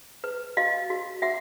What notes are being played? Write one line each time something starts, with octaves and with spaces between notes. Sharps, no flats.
B4
F#4 D#5 F5
F#4
F#4 E5 F#5